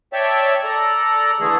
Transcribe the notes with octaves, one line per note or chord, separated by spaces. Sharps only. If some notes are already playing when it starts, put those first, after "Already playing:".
C#5 D5 E5 G5 A5
A4 D5 A#5
D3 E3 A3 G#4 A4